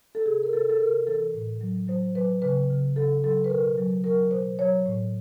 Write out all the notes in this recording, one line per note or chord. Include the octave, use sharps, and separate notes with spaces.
A4
C3 G#4
A#4
C3 A4
A4
C3 A#4
E3 A4
A2
F#3
F#3 C5
F#3 B4
C#3 B4
C#3
C#3 A4
F#3 A4
B4
B2 A#4
F#3
F#3 A#4
B2 C5
F#3 C#5
A2